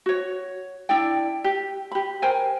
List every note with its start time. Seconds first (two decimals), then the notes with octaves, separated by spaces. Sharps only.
0.06 F#4 C#5
0.89 D4 E4 D5 G5
1.44 G4
1.92 G4 B5
2.22 A#4 C5 G5 G#5